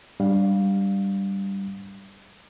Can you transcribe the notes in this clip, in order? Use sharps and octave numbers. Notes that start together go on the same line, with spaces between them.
G#2 G3 D4 F5